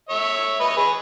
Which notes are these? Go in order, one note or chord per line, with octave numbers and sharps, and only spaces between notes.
C#5 E5
B4 D#5
C#5
G#4 B4